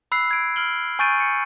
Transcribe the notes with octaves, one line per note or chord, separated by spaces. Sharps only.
B5 E6 F#6 C7
G#6 D7
F6 D7 F#7 G7
G#5 C#6 G6 A6 D7 D#7
C#7